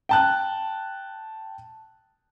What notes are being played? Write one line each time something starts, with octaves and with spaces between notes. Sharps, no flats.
G5 A5 F#6